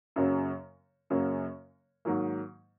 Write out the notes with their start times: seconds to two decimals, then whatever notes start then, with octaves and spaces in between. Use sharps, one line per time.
0.16 F#2 C#3 F#3 A#3 C#4
1.10 F#2 C#3 F#3 A#3 C#4
2.05 G#2 D#3 F#3 A#3